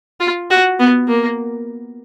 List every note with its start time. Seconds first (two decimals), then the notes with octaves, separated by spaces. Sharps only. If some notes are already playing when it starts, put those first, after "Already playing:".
0.20 F4
0.50 F#4
0.79 B3
1.08 A#3